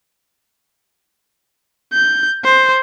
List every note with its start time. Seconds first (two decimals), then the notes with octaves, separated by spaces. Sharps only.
1.93 G6
2.44 C5